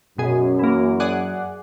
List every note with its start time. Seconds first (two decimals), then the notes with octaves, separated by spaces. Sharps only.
0.18 F#2 B2 G#4
0.59 E3 A#3
1.00 G#4 D5 F#5